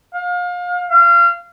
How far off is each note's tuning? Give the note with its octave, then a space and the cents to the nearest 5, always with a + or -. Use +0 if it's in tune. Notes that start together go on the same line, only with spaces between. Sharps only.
F5 +30
F5 -25